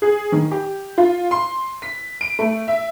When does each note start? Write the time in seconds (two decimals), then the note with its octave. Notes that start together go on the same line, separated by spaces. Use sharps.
0.02 G#4
0.32 D#3
0.51 G4
0.98 F4
1.31 C6
1.82 B6
2.21 D7
2.39 A3
2.68 E5